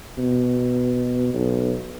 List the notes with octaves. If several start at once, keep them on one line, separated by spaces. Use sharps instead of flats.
B2
B1